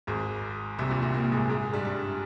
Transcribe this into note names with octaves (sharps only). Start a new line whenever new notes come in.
G#1 G#2
C2 C3
A#1 A#2
C2 C3
A#2 A#3
G#2 G#3
G#2 G#3
G2 G3
G2 G3